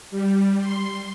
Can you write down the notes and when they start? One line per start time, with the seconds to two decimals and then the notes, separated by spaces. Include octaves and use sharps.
0.11 G3
0.60 C6